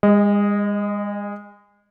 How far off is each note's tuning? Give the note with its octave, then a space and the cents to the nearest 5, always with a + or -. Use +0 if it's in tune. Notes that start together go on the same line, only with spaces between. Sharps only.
G#3 -35 D#5 +0